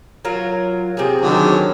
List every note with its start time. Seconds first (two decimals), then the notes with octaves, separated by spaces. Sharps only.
0.25 F#3 F4 A#4
0.97 C3 G#4
1.21 D3 D#3 F#3